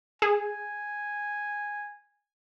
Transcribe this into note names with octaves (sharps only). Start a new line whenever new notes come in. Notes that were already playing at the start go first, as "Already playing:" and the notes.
G#4 G#5